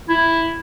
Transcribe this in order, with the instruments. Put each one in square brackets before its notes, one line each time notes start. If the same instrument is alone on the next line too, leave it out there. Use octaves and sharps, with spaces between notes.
[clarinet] E4